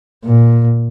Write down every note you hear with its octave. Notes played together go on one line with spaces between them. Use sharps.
A#2